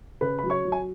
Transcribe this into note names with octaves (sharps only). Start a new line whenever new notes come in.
C#3 B4 B5
F#3 B5
C#5 C#6
F#3
G#5